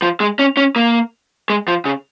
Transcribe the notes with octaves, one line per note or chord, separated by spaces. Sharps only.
F3
G#3
C#4
C#4
A#3
G#3
F3
C#3